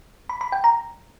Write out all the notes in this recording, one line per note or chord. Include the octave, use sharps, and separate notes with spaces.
B5
B5
G5
A#5